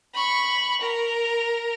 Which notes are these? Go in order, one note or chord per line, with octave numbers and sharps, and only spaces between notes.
B5 C#6
A#4